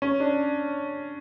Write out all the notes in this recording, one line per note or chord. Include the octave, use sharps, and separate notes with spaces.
C#4
D4